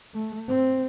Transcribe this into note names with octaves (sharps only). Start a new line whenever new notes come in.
A3
C4